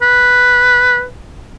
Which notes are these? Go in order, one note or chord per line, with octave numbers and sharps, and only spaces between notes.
B4